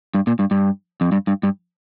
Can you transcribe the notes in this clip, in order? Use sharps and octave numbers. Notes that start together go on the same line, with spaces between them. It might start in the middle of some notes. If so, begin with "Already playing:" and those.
G2
A#2
G2
G2
F2
G2
G2
G2